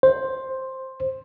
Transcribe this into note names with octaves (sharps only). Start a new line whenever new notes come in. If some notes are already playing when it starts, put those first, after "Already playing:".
C5